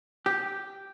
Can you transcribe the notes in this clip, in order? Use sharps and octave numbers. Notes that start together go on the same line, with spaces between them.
G4